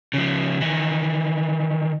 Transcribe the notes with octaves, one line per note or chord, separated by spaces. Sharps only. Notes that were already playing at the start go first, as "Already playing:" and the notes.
C#3 F3
D#3 E3